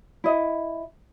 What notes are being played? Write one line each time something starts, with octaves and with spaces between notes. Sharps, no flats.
E4 D#5